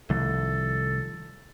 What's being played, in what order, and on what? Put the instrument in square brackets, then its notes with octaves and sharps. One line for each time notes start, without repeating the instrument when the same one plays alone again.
[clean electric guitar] C2 [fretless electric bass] D#3 F3 A3 [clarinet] A4